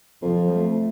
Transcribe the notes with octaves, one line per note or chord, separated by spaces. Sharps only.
F2 F3
A3